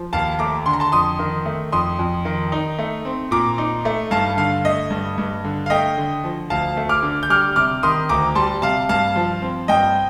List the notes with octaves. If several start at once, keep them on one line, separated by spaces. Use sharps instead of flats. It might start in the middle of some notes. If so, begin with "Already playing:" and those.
Already playing: F3
D#2 F5 A5
A3 A#5 D6
D3 C6
A#5
A5 C6
F2 C6 D#6
D#3
A3
F2 C6 D#6
F2
D#3
D#4
A3
C4
A#2 A#5 D6
D#4
A3
G2 F5 A5
D3 F5
A3 D#5
G2
G2
D3
F5
A3 D#5 G5
D3
F3
D2 F5 A5
A3
D6 F6
D3
G6
G3 D6 F6
C3 D6 F6
D#3 C6 D#6
D2 A#5 D6
G3 A5 C6
C3 F5 A5
G2 F5 A5
F3
C4
G2 D#5 G5